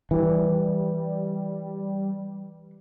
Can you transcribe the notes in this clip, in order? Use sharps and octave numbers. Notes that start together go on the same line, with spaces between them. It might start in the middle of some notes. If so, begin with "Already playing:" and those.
E3 G3